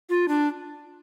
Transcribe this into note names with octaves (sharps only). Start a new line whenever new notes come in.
F4
D4